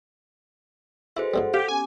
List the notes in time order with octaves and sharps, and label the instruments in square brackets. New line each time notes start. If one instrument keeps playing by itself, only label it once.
[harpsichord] E4 [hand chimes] F#4 G#4 C5 [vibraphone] A4 B4 D#5
[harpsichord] G#2 B2 G3 [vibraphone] A4 F#5
[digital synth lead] G4 [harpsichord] F5
[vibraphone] B3 C#4 G4 [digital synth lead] G#5 [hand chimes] D6